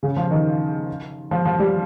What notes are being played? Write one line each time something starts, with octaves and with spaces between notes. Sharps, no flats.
C#3
F3
D#3
F3
F3
G3